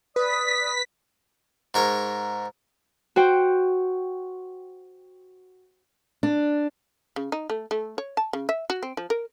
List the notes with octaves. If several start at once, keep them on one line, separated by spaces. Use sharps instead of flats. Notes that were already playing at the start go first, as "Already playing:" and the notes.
B4 D5 D#6 B6
G#2 A#4 C#5
F#4 C5 G5
D4
C#3
D#4
A3
A3
C#5
A5
C#3
E5
F#4
C4
F3
A#4